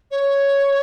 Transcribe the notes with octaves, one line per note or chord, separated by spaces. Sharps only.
C#5